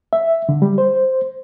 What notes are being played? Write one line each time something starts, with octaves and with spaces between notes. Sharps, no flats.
E5
D3
G3
C5